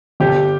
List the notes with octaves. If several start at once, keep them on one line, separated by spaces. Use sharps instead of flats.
G1 G4